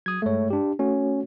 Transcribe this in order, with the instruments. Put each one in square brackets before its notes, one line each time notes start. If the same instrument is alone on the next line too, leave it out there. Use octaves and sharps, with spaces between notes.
[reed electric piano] F#3 [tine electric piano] D#6 G#6
[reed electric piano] G2 G#3 [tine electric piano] A3 C#5
[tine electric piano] D4 G4
[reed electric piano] A3 F#4 C#5 [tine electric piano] C#4